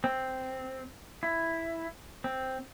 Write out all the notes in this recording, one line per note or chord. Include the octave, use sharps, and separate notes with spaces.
C4
E4
C4